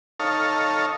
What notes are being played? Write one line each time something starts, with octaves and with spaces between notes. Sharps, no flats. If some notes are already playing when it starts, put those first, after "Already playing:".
D#4 A4 C#5 F5